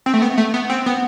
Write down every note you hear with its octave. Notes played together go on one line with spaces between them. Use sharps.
C4
A3
B3
A3
B3
C4
B3